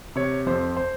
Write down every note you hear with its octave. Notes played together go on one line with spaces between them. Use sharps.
C3 C#5
F2 C5
C5